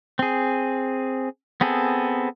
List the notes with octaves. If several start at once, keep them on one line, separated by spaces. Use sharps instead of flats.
C4 G#4
B3 C4 G#4 A4